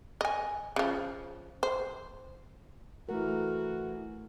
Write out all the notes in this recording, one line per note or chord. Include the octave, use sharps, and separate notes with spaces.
D#5 G#5
C#3 F3
C5
E3 A3 F#4 A#4